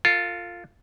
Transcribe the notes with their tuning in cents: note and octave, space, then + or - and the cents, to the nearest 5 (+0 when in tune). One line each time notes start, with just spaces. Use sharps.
F4 +0 A4 +35